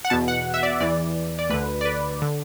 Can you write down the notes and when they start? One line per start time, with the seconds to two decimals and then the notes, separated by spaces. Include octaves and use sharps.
0.05 F#5
0.10 E2 B2 A5
0.28 F#5
0.54 E5
0.63 D5
0.81 E2 E3 D5
1.39 D5
1.50 D2 D3 B4
1.81 D5
1.85 B4
2.22 D3